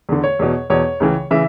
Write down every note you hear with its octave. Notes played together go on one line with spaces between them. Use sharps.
E2 D3
C#5
E2 B2
E2 B2 C#5
C#2 C#3 E3
C#3 E3 E5